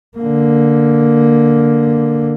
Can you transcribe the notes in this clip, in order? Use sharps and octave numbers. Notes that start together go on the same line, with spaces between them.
D3 A#3